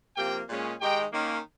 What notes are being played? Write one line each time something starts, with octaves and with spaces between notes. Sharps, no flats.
C3 F3 A#3 G4 G5
A#2 G#3 C#4
D#3 G#3 D#4 G4 G5
D#3 A#3 C#4